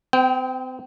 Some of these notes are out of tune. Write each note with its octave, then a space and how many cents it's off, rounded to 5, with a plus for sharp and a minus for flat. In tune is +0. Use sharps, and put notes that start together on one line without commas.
C4 -40 G5 +0